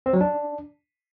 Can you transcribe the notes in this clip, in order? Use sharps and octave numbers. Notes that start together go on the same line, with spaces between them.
C4
F#3
D4